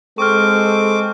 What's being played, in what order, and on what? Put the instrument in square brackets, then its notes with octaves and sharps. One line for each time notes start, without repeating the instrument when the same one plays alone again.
[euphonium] G#3 [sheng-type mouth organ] C4 D6 [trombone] A4 [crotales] C#6 F6